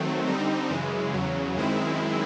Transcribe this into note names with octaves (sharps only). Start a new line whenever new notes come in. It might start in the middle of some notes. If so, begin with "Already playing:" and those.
Already playing: D#3 F#3 A3 C4
D3 G3 C4 D#4
F#2 C#3 E3 G#3
E2 C#3 F#3
F#2 D#3 G#3 C4 E4